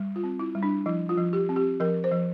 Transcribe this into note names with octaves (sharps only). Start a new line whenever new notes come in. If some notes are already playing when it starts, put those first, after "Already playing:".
Already playing: G3
F4
C4
E4
G3
D4
F3 E4
F4
F3
G4
C4
G4
F3 A#4
C5
F3